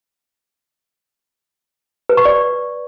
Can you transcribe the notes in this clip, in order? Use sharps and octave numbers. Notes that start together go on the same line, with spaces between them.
B4
C#6
D5